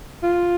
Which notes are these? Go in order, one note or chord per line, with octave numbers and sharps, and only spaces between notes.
F4